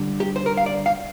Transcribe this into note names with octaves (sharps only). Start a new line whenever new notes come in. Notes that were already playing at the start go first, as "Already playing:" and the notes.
Already playing: D3 G3 D4
G4
C5
A#4
F5
D5
F5